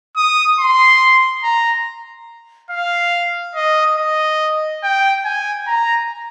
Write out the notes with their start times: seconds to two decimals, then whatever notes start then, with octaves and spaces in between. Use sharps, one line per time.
0.17 D#6
0.59 C6
1.43 A#5
2.71 F5
3.56 D#5
3.98 D#5
4.84 G5
5.25 G#5
5.68 A#5